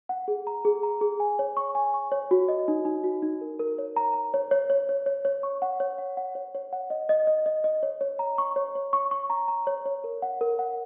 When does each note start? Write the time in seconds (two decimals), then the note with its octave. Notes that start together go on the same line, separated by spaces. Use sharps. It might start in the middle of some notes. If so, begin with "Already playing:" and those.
0.09 F#5
0.28 G#4
0.47 A#5
0.65 G#4
0.83 A#5
1.01 G#4
1.20 G#5
1.39 C#5
1.57 C#6
1.75 G#5
1.94 C#6
2.12 C#5
2.31 F#4
2.48 D#5
2.68 D#4
2.85 D#4
3.04 F#4
3.22 D#4
3.41 A#4
3.59 A#4
3.78 C#5
3.96 A#5
4.14 A#5
4.34 C#5
4.51 C#5
4.70 C#5
4.89 C#5
5.06 C#5
5.25 C#5
5.43 C#6
5.62 F#5
5.80 C#5
5.98 F#5
6.17 F#5
6.35 C#5
6.55 C#5
6.73 F#5
6.90 D#5
7.09 D#5
7.27 D#5
7.46 D#5
7.64 D#5
7.83 C#5
8.01 C#5
8.19 A#5
8.38 C#6
8.56 C#5
8.75 C#5
8.93 C#6
9.11 C#6
9.30 A#5
9.48 A#5
9.67 C#5
9.86 C#5
10.04 A#4
10.22 F#5
10.41 A#4
10.59 F#5